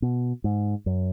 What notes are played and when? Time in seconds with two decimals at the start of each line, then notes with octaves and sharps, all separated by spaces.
0.02 B2
0.44 G#2
0.86 F#2